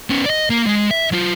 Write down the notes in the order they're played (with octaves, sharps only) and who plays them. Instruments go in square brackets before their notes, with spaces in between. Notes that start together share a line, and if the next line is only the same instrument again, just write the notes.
[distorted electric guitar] B3 C#4
D5 D#5
A#3
G#3
E5
F#3 F4